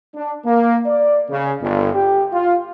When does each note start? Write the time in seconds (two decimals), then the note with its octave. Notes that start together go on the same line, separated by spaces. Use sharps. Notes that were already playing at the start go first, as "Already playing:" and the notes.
0.15 D4
0.45 A#3
0.86 D5
1.30 C#3
1.61 G1
1.94 G4
2.33 F4